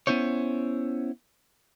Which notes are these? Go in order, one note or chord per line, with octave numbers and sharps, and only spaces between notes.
B3 C#4 E4 C5 C#5